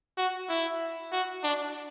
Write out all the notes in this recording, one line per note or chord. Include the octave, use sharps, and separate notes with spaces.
F#4
E4
F#4
D4